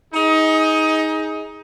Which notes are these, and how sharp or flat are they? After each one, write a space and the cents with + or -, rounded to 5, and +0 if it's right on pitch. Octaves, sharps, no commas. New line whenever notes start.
D#4 +20 G#4 +0